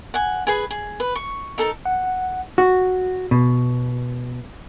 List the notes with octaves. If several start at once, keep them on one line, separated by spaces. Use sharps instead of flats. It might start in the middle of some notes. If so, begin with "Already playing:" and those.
F#5 G#5
G#4 B4 G#5
G#4
B4
C#6
D#4 A4 A#4 A5
F#5
F#4
B2